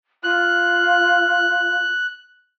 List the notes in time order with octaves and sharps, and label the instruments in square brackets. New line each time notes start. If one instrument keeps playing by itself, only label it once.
[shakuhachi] F4 [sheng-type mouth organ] F#6